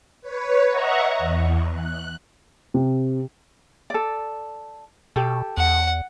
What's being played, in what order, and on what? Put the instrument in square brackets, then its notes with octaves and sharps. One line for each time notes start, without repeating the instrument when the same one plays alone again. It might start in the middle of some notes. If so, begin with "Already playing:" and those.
[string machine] B4 C#5
D#5 E5 F#5 A#5 C#6
E2
F#6
[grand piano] C3
[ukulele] A4 D5
[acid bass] B2 [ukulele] G4 A4
[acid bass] E2 [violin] F#5